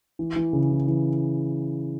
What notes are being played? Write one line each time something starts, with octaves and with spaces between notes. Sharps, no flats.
E3
E3
C#3
E3
E3